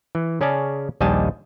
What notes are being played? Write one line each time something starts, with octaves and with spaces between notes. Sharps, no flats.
E3
C#3 C#4 G#4 D5 A5
A#1 D#2 G3 D#5 G#5 A5